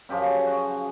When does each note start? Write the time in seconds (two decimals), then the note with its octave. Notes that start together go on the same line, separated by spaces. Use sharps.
0.09 F#2 C#3 F3 G4
0.46 F#4